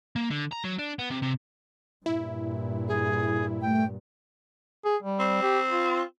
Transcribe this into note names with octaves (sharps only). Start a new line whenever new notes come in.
A#3
D3
A#5
F#3
D4
B3
C3
C3
G2 A#2 E4
G#4
A3 G5
G#4
G3
C4
G4
F4